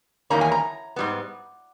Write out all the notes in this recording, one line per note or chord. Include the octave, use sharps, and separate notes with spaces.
E2 D#3 G3 A#3 C#4 A#5
G#5
A#5
G#2 G3 B3